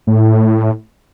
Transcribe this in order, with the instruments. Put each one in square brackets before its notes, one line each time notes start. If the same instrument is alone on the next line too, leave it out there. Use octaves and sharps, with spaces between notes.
[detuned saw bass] A2